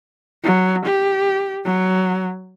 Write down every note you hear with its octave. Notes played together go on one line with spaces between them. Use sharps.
F#3
G4
F#3